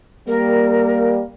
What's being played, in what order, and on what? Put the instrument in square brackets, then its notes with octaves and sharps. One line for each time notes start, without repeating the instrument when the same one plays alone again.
[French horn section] G3 A#3 [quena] A#4